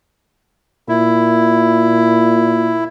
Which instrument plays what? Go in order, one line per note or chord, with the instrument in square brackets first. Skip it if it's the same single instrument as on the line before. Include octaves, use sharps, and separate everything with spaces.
[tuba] A#2 [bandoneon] E4